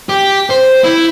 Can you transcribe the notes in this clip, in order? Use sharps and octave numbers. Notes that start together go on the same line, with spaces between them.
G4
C5
E4